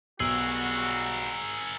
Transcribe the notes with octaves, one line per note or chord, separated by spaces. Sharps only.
B1 G3 F#4 G#4 A#4 E6